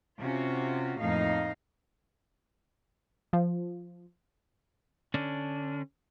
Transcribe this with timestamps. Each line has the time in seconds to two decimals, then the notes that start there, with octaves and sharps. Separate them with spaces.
0.20 C3 C#4 F4 F#4
1.00 F2 A2 A#3 D#4 F5
3.33 F3
5.14 D3 C#4 D4